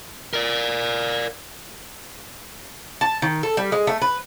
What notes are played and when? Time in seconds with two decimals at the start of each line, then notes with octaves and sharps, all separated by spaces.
0.33 A#4 D5
3.01 A5
3.22 D#3
3.43 A4
3.57 G3
3.72 G#3
3.87 A3
4.02 B4